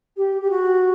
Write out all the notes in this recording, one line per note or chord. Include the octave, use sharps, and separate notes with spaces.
G4
G4
F#4